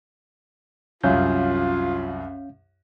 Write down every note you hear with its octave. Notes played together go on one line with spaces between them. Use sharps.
C2 F#2 C#4 F4 F5 G6